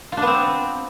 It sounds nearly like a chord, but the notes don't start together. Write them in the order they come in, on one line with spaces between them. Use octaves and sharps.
F4 D4 B3 C4